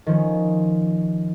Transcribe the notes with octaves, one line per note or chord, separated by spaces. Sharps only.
D#3 F3 C#4